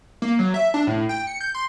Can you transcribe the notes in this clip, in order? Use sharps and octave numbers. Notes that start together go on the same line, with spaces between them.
A#3
F#3
E5
D4
A2
G5
C#7
G6
C6